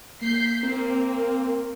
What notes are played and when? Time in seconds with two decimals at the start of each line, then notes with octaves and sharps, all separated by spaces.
0.21 A#3 G6 B6 C7
0.63 A#3 C4 A#4